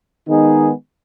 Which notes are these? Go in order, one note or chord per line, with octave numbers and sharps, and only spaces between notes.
D#3 G#3 B3 D#4 G#4